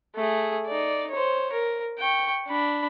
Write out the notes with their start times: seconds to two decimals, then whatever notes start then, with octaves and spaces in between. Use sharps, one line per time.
0.15 A3 G#4
0.66 D#4 D5
1.11 C5 C#5
1.52 A#4
1.98 G5 C#6
2.48 D4 B5